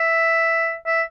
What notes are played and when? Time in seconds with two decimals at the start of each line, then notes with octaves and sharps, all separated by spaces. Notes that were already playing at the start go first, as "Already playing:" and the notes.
Already playing: E5
0.86 E5